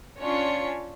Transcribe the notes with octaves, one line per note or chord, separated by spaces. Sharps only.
C#4 D4 F4 C#5 C#7